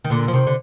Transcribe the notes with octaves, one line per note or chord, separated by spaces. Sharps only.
D#3
A#2 D3
F3
C3 D#3
D3